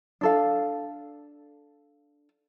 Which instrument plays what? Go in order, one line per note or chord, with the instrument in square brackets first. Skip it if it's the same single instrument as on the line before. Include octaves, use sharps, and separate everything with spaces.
[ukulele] D4 A4 F5